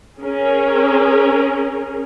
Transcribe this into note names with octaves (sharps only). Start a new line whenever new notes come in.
C#4 G#4 A#4